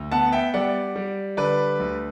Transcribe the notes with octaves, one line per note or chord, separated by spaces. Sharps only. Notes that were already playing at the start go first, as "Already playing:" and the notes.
Already playing: D2
B3 F#5 A5
E5 G5
G3 D5 F#5
G3
D3 B4 D5
D2